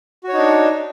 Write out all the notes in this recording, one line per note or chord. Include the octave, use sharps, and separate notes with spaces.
D4 D#4 F#4 C#5